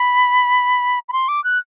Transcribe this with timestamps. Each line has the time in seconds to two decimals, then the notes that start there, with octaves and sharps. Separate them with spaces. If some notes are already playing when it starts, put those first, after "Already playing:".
Already playing: B5
1.09 B5
1.13 C6
1.28 D6
1.44 F#6